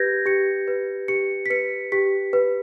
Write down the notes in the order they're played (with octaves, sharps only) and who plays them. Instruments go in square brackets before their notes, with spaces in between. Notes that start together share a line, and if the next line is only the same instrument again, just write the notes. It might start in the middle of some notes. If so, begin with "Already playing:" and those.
Already playing: [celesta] G4 B4 G6 G#6 A#6
G4 C#7
B4
G4 C#7
B6
B4 C#7
G4 B6
B4